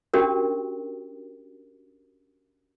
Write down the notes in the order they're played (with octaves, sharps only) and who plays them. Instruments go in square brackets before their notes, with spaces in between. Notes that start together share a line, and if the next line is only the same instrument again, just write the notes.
[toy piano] C#4 D4 F#4 G4 A#4